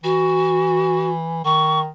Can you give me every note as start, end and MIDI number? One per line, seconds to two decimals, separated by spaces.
0.04 1.45 52
0.04 1.09 66
1.45 1.89 51
1.45 1.80 85